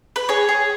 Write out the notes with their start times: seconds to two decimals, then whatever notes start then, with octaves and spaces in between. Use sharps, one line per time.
0.16 B4
0.29 G#4 C#5
0.49 G#4